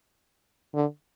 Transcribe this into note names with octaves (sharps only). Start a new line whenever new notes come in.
D3